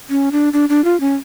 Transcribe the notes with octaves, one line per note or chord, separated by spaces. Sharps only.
C#4
D4
D4
D4
F4
C#4